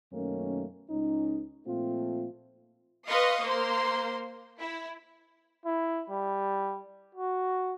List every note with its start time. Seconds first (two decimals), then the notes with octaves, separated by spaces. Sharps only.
0.12 F#2 B2 D#3 A3 A#3 C#4
0.90 C#2 C#4 D#4
1.66 A#2 F3 A3 C4 F4
3.08 B4 D#5 F5 C6 C#6 D#6
3.42 A#3 C5 C6
4.60 E4
5.65 E4
6.10 G3
7.15 F#4